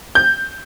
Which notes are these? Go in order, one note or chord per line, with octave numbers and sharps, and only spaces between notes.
G6